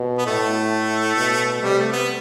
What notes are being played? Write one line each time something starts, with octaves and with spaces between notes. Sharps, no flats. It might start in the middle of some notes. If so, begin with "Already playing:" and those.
Already playing: B2
B3
A2 A3
B2
C3 G3
A3
B3